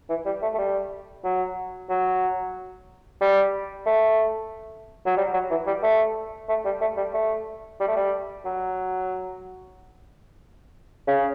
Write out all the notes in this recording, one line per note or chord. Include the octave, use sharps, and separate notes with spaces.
E3
G3
A3
A3
G3
F#3
F#3
G3
A3
F#3
G3
F#3
E3
G3
A3
A3
G3
A3
G3
A3
G3
A3
G3
F#3
C#3